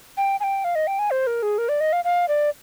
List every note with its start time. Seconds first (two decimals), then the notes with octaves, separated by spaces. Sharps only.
0.17 G5
0.40 G#5
0.43 G5
0.64 F5
0.75 D#5
0.87 G5
0.99 G#5
1.11 C5
1.27 A#4
1.43 G#4
1.58 A#4
1.69 D5
1.80 D#5
1.93 F5
2.04 F5
2.28 D5